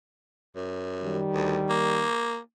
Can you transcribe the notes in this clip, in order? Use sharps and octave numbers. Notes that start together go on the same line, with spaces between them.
F#2
D#3 G3
D2
A#3